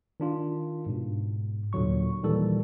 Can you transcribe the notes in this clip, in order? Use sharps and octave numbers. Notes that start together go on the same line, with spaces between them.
D#3 D4 F4
G#2 B2
D#2 A#2 D3 F#3 C#6
A#2 D#3 E3 G3 A4